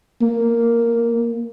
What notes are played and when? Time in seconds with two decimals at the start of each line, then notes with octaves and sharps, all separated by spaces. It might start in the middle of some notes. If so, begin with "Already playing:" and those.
0.22 A#3